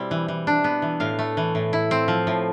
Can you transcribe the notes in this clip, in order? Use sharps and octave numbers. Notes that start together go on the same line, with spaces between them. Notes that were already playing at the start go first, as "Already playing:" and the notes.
Already playing: B2 G3 C4 E4
E3
E3
D4
B3
E3
A2 F5
A3
E3
A2
E4
C4
F3
A2